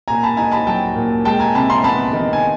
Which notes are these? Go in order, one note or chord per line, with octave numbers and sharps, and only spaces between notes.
A#2 G#5 A#5
A5 B5
D#4 G#5 A#5
A5 B5
F#3 G5 A5
A#2
G#3 G5 A5
G#5 A#5
C3 A5 B5
A#5 C6
B3 A5 B5
D#3
G#5